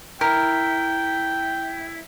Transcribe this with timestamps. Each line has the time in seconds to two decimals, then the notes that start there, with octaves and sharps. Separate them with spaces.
0.21 E4 A#4 G5